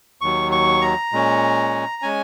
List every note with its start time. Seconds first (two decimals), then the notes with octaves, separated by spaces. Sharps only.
0.21 D#2 D#3 F#3 C#6
0.52 C#6
0.81 A#5
1.13 A#2 G#3 C#4
2.02 G#3 C#4 G#5